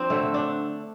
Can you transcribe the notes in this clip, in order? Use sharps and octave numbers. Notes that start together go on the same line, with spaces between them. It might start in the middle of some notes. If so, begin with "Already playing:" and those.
Already playing: F3 C4 D4
D3 A3
D4